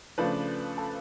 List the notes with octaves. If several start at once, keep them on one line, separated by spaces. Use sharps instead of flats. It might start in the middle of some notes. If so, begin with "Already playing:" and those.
C#3 F3 A3 D4 B4
A4